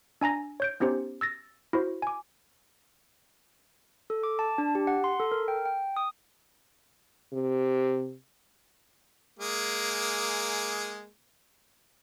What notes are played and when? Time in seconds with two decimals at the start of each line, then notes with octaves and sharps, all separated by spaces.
0.21 D4 G#5 A#5 A#6
0.60 C#5 G6 D7
0.80 B3 C#4 D#4 G4 C5
1.21 E6 A6 A#6
1.73 E4 F#4 C5
2.02 G#5 D6
4.10 A4
4.23 D6
4.39 A5
4.58 D4
4.75 G4
4.87 F#5
5.04 C6
5.20 A4
5.32 A#4
5.48 G5
5.66 G5
5.96 D#6
7.33 C3
9.39 G#3 A#3 G#4